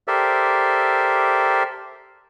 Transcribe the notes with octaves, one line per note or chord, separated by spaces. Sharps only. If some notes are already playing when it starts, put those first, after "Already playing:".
G4 A4 A#4 C5 D5 E5